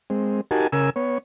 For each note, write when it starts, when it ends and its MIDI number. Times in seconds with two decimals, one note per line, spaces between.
0.10 0.41 56
0.10 0.41 60
0.51 0.67 63
0.51 0.67 66
0.51 0.67 67
0.51 0.67 70
0.51 0.67 80
0.51 0.67 81
0.72 0.90 49
0.72 0.90 70
0.72 0.90 80
0.72 0.90 88
0.96 1.18 59
0.96 1.18 73